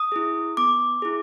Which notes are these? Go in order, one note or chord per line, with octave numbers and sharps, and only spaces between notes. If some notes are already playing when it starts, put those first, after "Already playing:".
Already playing: D#6
E4 G#4
B3 D6
E4 G#4